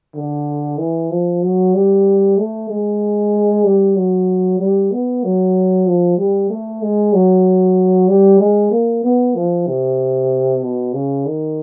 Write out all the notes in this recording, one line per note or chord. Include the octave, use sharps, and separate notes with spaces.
D3
E3
F3
F#3
G3
A3
G#3
G3
F#3
G3
B3
F#3
F3
G3
A3
G#3
F#3
G3
G#3
A#3
B3
F3
C3
B2
C#3
D#3